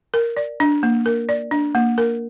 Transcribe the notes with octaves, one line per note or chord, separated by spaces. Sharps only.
A#4
D5
D4
A#3
A#4
D5
D4
A#3
A#4